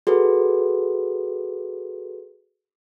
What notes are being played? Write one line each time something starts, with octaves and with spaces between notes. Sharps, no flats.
F#4 G#4 A4 B4